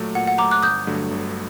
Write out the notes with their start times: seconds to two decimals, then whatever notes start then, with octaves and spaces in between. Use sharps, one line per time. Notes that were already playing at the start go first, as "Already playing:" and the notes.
Already playing: A#2 F#3 A3
0.15 A#2 F#5
0.27 F#5
0.38 F#3 A3 A#5 D6
0.51 D6 F#6
0.63 G1 D#6 G6
0.87 G2 D3 F#3 A3
1.11 G1